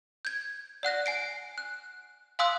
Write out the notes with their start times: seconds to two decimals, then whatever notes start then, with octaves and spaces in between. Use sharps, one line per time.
0.25 G6 G#6
0.83 D5 F#5 F#6 A#6
1.06 G#5 C7 D7
1.58 F#6
2.39 F5 G#5 C6 D#6 E6 F#6